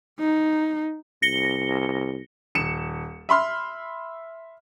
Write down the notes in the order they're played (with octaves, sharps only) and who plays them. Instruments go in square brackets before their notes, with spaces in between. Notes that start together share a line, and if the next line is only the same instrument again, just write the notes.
[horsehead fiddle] D#4
[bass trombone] C2 [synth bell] A#6 C#7 G7
[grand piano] D#1 C#7 E7
E5 B5 C6 F6